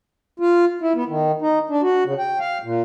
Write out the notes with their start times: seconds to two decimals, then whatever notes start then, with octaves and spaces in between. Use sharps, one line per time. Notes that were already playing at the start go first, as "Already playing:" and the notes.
0.40 F4
0.82 E4
0.95 B3
1.09 D#3
1.41 D#4
1.70 D4
1.82 F#4
2.05 C#3
2.19 G5
2.40 F5
2.64 A#2